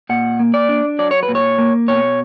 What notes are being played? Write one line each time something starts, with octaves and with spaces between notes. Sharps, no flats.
A#2 F#5
A#3
D5
D4
F#3 D5
C#5
B4
A#2
C#5
A#3
B2 C#5